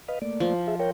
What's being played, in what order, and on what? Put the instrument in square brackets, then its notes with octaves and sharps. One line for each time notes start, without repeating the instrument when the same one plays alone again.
[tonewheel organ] B4 D#5 F5
A3 A#3 D5
[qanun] F3
[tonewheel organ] G#4 E5
A#4 C#5 G5